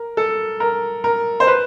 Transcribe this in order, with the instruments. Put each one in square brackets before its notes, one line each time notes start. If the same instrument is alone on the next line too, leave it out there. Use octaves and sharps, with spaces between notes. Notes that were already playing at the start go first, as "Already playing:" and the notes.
Already playing: [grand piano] A#4
A4
A#4
A#4
C5
B4